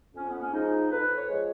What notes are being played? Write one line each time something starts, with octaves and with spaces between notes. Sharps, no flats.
F2 C#4
B3
C#4
F3 G#3 D#4
F2 B4
C#5
F3 G#3